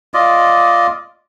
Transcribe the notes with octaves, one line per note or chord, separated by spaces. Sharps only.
F4 D5 D#5